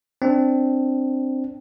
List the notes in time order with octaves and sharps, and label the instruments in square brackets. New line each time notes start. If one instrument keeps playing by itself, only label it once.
[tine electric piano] C4 D4